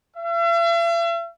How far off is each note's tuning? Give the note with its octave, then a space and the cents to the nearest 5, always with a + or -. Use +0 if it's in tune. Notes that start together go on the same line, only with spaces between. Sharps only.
E5 +45